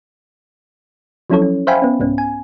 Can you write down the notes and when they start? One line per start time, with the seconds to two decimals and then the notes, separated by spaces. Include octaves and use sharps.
1.30 F3 F#3 C#4 E4 A4 C#5
1.42 C#4
1.67 C5 E5 F5 G5 G#5 B5
1.82 B3 C#4
1.99 C2 G#2 B3 C#4
2.18 G#5